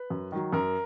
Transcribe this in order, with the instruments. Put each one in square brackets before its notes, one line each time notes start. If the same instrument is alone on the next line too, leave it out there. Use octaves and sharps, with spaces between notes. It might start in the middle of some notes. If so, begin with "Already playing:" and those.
Already playing: [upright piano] B4
F#2
D#3 F#3
F#2 A#4